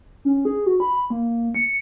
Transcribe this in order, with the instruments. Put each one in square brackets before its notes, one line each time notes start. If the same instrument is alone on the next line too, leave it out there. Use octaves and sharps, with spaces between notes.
[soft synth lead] C#4
G#4
F#4
B5
A#3
C#7